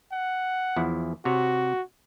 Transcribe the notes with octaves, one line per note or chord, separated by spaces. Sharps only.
F#5
E2 F3 E4
C3 F#4 C#5